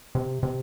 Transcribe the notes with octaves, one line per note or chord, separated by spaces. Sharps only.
C3
C3